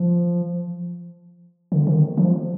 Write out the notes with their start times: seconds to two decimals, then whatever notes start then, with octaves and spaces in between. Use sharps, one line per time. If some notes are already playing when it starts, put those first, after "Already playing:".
Already playing: F3
1.72 D3
1.87 D#3
2.17 F3